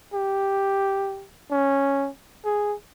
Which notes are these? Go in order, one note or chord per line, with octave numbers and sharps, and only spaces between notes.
G4
C#4
G#4